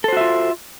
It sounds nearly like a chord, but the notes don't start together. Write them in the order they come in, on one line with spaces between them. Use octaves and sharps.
A4 C5 F#4 E5 F4